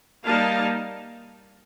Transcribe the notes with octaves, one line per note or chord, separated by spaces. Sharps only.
G3 A#3 D#4 F5 A5